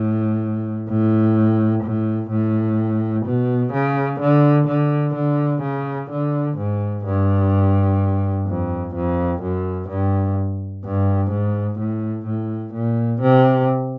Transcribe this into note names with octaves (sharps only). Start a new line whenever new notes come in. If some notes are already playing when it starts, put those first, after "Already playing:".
Already playing: A2
A2
A2
A2
B2
C#3
D3
D3
D3
C#3
D3
G#2
G2
F2
F2
F#2
G2
G2
G#2
A2
A2
A#2
C3